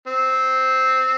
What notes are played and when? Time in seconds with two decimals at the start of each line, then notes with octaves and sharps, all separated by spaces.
0.07 C4